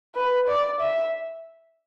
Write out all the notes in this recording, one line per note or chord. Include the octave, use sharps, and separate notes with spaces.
B4
D5
E5